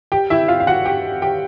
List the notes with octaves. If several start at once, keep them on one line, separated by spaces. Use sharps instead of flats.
G4 G5
E4 E5
F4 F5
F5
F#4 F#5
G4 G5
G4 G5